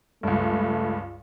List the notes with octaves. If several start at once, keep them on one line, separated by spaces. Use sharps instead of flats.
C#2 G2 A3